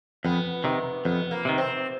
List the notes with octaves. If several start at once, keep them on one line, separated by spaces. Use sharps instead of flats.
F2 B3
C3 D#3
F2 B3
A#3
C3 D#3
C4